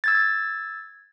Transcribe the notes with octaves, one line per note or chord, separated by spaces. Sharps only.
E6 G#6 A6